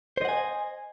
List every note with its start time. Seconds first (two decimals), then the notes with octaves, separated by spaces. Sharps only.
0.17 C5
0.21 D#5
0.25 F#5
0.29 G#5